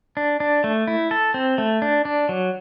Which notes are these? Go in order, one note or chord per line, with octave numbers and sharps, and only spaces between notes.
D4
D4
A3
E4
A4
C4
A3
D4
D4
F#3